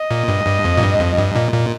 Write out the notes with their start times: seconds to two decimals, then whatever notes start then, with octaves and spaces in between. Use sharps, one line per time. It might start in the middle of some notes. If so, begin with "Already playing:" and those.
Already playing: D#5
0.11 A#2
0.28 G2
0.46 G2
0.65 F2
0.77 A#2
0.82 G2
1.00 F2
1.18 G2
1.35 A#2
1.53 A#2